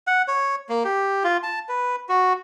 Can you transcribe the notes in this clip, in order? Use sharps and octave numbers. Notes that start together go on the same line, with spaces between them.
F#5
C#5
A#3
G4
F4
A5
B4
F#4